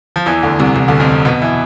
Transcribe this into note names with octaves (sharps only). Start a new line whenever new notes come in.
F3
E2 E3
D2 D3
C2 C3
C2 C3
D2 D3
F2 F3
B2 B3
E3 E4